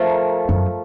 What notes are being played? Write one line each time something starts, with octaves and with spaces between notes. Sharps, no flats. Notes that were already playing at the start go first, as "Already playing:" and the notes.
Already playing: F3 A3 F4 A#4
F#2